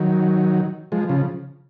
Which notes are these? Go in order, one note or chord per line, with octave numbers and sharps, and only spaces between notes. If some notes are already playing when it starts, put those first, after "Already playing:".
Already playing: D#3 F#3
F3 G#3
C#3 F3